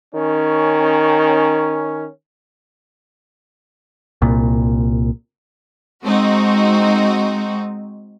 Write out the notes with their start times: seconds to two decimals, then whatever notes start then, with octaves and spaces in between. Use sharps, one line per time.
0.14 D#3 C#4
4.22 C2 A#2
6.05 G#3 C4 D#4 F#4